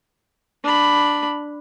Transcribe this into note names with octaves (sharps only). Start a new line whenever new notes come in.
D4 B5